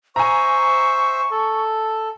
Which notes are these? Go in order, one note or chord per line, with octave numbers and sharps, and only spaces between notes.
C5 E5 G#5 A#5 C#6
A4